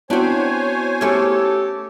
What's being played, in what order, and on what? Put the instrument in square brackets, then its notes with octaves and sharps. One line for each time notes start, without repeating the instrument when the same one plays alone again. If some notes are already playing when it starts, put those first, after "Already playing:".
[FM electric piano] B3 E4 F#4 [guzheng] C4 D4 [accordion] C5 C#5 G#5
[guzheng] A3 C#4 [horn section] G4 A4